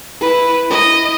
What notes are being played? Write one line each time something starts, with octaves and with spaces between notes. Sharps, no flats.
E4 B4
E4 D#5